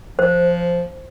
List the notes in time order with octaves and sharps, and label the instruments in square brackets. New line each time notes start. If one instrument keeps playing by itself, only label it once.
[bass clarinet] F3 [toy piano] C5